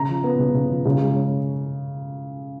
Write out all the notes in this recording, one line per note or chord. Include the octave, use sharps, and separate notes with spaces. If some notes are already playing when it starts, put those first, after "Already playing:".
Already playing: C#3 A#5
F3
B3
C#3
C#3
F3
C#3
G#3
C#4